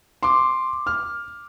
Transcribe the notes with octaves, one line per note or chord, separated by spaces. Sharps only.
C6 D6
F6